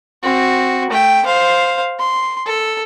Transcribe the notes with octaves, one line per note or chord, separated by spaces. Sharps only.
C4 F#4
A3 G5
C5 F5
C6
A4